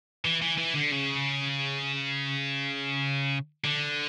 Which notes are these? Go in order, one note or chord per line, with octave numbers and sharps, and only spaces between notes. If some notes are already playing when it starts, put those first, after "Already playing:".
E3
E3
E3
D3
C#3
D3